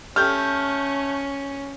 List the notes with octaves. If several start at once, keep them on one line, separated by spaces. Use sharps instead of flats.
A3 C#4 G4 A4 G5 F6 G6